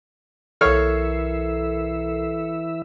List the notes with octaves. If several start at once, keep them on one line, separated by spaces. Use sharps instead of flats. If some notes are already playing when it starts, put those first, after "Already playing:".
B1 E3 A4 A#4 C#5 E5 F6 C7